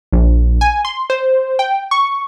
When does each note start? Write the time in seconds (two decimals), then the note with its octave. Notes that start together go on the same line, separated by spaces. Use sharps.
0.13 A#1
0.61 G#5
0.85 C6
1.10 C5
1.59 G5
1.91 C#6